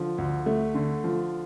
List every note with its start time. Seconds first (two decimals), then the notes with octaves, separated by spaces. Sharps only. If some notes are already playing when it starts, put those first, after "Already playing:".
Already playing: D3 F3
0.18 D2
0.46 A3
0.75 D3
1.04 F3